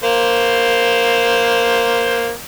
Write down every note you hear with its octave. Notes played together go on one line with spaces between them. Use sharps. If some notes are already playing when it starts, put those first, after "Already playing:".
A#3 C5